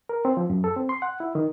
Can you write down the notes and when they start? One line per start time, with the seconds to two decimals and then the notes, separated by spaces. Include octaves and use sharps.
0.09 A#4
0.25 C4
0.37 F3
0.50 F#2
0.64 A4
0.77 C4
0.89 C6
1.02 F#5
1.20 E4
1.35 D#3